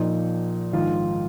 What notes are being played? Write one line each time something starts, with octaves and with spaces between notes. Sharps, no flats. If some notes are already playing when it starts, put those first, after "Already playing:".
Already playing: A#1 A#2 F3 D#4
A#1 G#2 D#3 F4